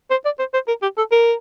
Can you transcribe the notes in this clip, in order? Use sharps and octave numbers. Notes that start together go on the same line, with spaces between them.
C5
D5
C5
C5
A#4
G4
A4
A#4